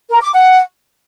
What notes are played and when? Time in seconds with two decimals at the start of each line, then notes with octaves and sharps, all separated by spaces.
0.10 A#4
0.21 D6
0.32 F#5